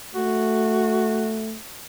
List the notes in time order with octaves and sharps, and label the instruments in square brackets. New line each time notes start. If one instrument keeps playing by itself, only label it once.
[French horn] A3 [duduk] F#4